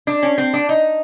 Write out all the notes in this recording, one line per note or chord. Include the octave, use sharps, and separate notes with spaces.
D4
C#4
C4
D4
D#4